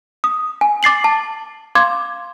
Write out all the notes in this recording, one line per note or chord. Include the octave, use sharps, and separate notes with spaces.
D#6
G#5
D6 A6 C7 F#7
A5
F5 C6 D6 G#6